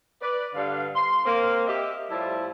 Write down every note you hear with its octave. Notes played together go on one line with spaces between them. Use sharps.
B4 D5
G2 D3 F5
C6
A#3 C4
G4 D#5 E5
A2 F3 G3 E4 A5